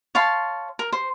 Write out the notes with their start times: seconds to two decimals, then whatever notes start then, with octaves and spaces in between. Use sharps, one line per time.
0.15 C#5 F5 A5 C6
0.79 A#4
0.92 C5